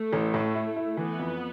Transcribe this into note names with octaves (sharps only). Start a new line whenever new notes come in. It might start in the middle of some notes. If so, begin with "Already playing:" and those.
Already playing: A3
A1
A2
E4
E4
E3 B3
F2